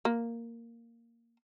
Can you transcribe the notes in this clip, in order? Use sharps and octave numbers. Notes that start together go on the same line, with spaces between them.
A#3